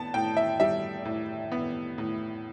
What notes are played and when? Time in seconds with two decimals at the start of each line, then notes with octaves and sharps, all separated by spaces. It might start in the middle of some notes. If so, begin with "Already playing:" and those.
Already playing: A2 B3 A5
0.14 A2 G5
0.37 E5
0.60 G3 E5
1.05 A2
1.52 B3
1.98 A2